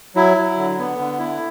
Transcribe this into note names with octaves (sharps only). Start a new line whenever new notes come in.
F#3 E4
F#3
D3
B3
D3
E4